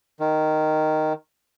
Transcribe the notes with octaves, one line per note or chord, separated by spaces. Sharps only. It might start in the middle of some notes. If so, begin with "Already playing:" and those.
D#3